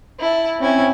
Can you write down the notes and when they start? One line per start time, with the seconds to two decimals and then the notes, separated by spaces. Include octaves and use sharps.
0.20 E4 A5
0.59 C4 C#4 E4 G#5